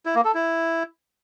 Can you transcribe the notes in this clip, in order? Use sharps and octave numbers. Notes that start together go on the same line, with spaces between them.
E4
A#3
A4
E4